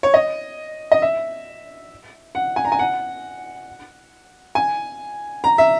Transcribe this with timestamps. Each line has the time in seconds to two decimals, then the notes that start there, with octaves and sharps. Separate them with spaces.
0.03 C#5
0.14 D#5
0.91 D#5
1.02 E5
2.35 F#5
2.56 G#5
2.65 A#5
2.72 G#5
2.79 F#5
4.55 G#5
5.44 A#5
5.58 E5